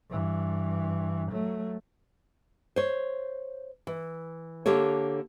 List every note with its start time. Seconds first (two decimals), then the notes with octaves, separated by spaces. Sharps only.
0.10 G2 E3
1.31 F#3 A3
2.76 C5 C#5
3.87 E3
4.66 D3 A#3 G4 A4 C#5